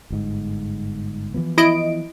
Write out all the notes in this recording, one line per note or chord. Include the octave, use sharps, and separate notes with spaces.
G1 G#2
E3 F3 B3
E4 D#5 D7